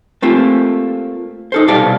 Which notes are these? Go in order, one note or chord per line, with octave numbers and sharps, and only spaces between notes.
A3 A#3 C4 F4 G4 A4
D#4 A4 C5
C2 B2 G4 D5 F5 A5